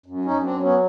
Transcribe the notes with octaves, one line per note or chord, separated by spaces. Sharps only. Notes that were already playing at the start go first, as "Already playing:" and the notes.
F#2
C#4 D#4
F#2
C4 D4
F#3
B3 C#4